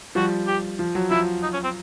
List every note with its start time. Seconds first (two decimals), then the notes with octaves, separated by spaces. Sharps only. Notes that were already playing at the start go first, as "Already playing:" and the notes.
0.15 F3 G3 F#4
0.47 G4
0.79 F3
0.95 F#3
1.11 F3 E4
1.42 D#4
1.53 C#4
1.64 C4